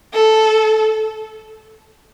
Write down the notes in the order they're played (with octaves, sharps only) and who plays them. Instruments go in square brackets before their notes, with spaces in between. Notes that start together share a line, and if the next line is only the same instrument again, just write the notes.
[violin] A4